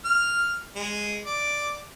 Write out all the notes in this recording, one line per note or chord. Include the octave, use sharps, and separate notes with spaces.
F6
G#3
D5